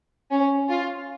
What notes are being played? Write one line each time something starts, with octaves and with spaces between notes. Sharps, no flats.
C#4
F4